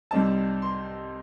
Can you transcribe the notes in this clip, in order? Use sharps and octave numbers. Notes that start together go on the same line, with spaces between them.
C2 C3 G3 C4 D#4 A5
C6